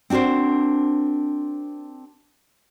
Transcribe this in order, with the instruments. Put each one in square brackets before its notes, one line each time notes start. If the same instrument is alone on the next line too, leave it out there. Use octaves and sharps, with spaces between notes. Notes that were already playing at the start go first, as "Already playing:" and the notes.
[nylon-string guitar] C4 D4 F#4 A#4 C5